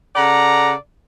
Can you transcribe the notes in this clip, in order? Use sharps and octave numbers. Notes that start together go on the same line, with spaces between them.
C#3 A4 D5 F#5 A#5